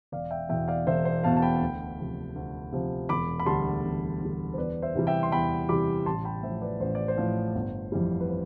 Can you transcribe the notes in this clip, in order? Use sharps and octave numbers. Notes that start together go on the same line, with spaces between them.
E1 D5 F5
E5 G5
E2 B2 E5 G5
D5 F5
E1 C5 E5
C5
E2 B2 F5 A5
A5
G5 B5
D2
C3 F3
D2
C3 F3
E1 B5 D6
B5
D2 D3 G3 A5 C6
E1
D2 D3 G3
C5
E2 B4 D5
C5 E5
C3 E3 G3
E5 G5
C6
E2 G5 B5
C3 E3 G3 B5 D6
A1 A5 C6
G5 B5
A2 F3 C5 E5
B4 D5
A1 C5
D5
C5
A2 F3
G1
F2 E3 G3
B4
C5